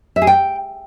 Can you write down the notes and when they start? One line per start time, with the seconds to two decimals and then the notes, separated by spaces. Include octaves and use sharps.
0.16 E5
0.22 G#4
0.27 G5